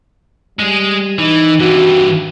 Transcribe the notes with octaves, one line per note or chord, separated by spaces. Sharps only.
G3 G#3 G#4
E3 D#4
G2 E3 F#4